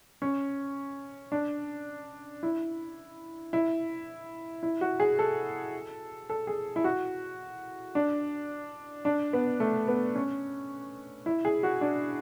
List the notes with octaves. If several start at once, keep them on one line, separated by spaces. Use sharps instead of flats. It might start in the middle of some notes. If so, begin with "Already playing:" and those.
C#4
D4
E4
E4
E4
F#4
G#4
A4
A4
G#4
E4
F#4
D4
D4
B3
A3
B3
C#4
E4
G#4
F#4
D4